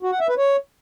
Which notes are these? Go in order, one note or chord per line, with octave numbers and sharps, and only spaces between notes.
F#4
F#5
E5
B4
C#5